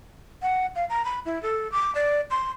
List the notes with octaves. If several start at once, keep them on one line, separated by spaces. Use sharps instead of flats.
F#5
F5
A#5
B5
E4
A4
D6
D5
C6